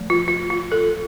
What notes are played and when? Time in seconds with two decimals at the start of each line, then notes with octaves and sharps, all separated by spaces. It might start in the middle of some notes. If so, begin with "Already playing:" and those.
Already playing: F3 A3
0.10 F4
0.28 F4
0.50 F4
0.72 A4